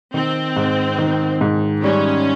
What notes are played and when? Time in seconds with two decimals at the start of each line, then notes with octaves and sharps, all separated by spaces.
0.14 D#3 C4
0.56 G#2
0.98 D#3
1.41 G#2
1.83 G3 C#4